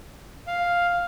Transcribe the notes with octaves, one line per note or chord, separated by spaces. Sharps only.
F5